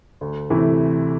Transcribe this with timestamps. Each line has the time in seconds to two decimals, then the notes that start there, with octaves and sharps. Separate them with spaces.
0.21 D2
0.50 C3 E3 A3 E4